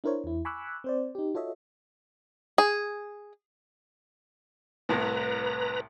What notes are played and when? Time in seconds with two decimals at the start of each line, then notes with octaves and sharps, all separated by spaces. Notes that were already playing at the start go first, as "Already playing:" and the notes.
0.04 D4 E4 A#4 C5 C#5
0.24 E2 E4
0.45 G#5 B5 C#6 D6 E6 F#6
0.84 C4 C5 D5
1.15 D#4 G4
1.34 F4 F#4 A4 C#5 D#5 E5
2.58 G#4
4.89 C2 A2 B4 A#5